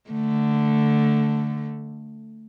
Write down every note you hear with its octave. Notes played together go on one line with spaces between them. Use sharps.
D3 A3